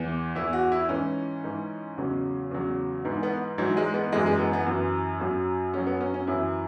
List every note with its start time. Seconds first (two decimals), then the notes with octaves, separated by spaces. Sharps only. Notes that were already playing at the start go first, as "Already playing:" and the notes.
Already playing: E2 E3
0.35 E2 E3 E4
0.53 F#4
0.72 E4
0.89 G#2 E3 C#4
1.44 G#2 E3
1.98 E2 C#3 F#3
2.51 E2 C#3 F#3
3.05 G#2 E3 B3
3.23 B3
3.58 G#2 E3 F#3
3.77 G#3
3.94 B3
4.12 F#2 E3 G#3
4.26 G#3
4.39 B3
4.53 B3
4.66 F#2 E3
5.20 F#2 F#3
5.74 F#2 F#3 C#4
5.87 B3
6.01 C#4
6.14 C#4
6.27 F#2 E3 E4